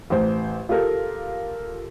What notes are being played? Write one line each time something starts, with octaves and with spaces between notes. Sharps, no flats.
A1 C5
F4 G4 A4 A#4